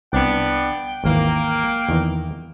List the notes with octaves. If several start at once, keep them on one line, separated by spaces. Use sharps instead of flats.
C2 B3 D4 G5
G#1 D#2 E3 A#3
E2 D#3 E3